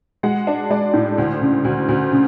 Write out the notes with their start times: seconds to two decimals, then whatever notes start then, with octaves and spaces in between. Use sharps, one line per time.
0.23 G#3 F#5
0.47 D4
0.70 G#3 D5
0.94 A2
1.18 D2
1.41 C#3
1.64 D2
1.88 D2
2.12 C#3